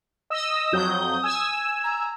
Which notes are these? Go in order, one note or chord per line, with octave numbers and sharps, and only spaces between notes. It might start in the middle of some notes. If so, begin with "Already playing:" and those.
D#5 E6
D#6
F2 F#3 G6
G#5 E6
A#5